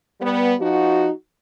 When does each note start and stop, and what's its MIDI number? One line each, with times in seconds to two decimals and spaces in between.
0.21 0.54 55
0.21 0.54 59
0.60 1.10 53
0.60 1.10 63
0.60 1.10 66